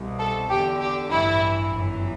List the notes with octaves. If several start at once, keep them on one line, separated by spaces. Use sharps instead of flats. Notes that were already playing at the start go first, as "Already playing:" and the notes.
Already playing: C2 B2
A4
E2 D3 G4
G4
A1 G2 E3 E4
G1 F#2 E3